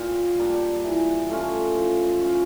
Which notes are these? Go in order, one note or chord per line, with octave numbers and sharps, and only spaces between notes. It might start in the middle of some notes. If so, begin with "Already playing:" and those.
Already playing: A#2 G5
F5
G3 A#3 D4
G5
E3
A3 C#4 F4
F3
C#4 F4